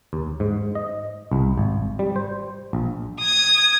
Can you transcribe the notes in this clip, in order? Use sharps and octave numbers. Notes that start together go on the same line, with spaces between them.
D#2
G#2
D#5
C2
G#1
G3
C5
A#1
D#6 G#6